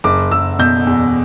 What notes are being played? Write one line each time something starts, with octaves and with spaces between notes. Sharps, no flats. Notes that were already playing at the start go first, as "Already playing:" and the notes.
F#1 D6
F#1 E6
B2 G6
E2